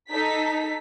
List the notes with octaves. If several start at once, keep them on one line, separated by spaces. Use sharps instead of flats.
D#4 A4 B6